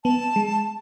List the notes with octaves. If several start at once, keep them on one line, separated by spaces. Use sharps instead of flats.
B3 A5
G#3